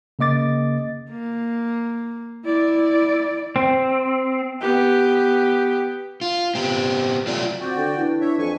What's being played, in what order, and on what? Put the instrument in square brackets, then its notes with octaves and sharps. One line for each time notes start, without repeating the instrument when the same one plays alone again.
[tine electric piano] C#3 A#3 D#5 D6 A6
[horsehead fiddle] A#3
E4 D5
[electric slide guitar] C4
[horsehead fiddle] B3 G4
[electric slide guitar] F4
B3 C4 G4
F#3 A3 F4 D5
[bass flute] C4 [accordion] F#4 D5 G5
[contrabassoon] D3
[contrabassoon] E3 [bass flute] D4
[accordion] C#5 E5
[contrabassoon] F2 [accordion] G#5 C#6